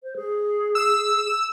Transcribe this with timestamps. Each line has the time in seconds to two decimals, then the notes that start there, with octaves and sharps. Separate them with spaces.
0.03 C5
0.16 G#4
0.75 E6